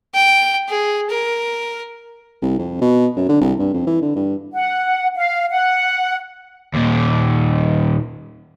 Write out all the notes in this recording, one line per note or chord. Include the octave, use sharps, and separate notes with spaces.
G5
G#4
A#4
C2
F2
B2
F#2
D3
C2
G2
F2
E3
D3
G2
F#5
F5
F#5
D#2 A#2